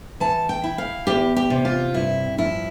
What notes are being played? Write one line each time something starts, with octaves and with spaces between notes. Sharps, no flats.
E3 A5
G5
E4
F5
E2 G4
G4
C3
F4
G2 E4
F3 E4